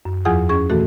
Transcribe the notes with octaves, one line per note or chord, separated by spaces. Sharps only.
F#2
E2 F3 F4 G#4 F#5 D#6
C#4 G#4 C#6
A#2 D#3 E3 A3 F#4 A4